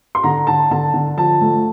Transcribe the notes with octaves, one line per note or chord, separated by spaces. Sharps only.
C6
D3 A#5
D3 A5
D3 A5
D3
F3 A5
A3